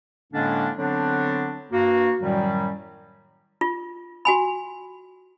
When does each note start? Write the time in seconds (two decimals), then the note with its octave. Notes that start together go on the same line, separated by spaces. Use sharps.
0.33 A2 D3 G#3 A#3 C#4 D4
0.78 D3 F#3 B3 C4 D4
1.72 G2 A#3 F#4
2.22 F#2 A2 D#3 F#3 G3
3.61 F4
4.25 F#4 G#5 B5